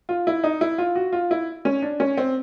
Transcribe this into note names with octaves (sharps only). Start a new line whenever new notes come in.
F4
E4
D#4
E4
F4
F#4
F4
E4
C#4
D4
C#4
C4